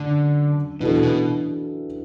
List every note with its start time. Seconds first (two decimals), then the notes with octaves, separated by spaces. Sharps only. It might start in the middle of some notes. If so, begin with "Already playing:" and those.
Already playing: F#2 D3 A3 D4
0.80 B2 E3 D4 F#4 A4
1.03 B2